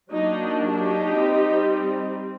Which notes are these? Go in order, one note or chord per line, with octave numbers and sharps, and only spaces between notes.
F#3 A#3 D4 D#4
D#4 G4
G3 C4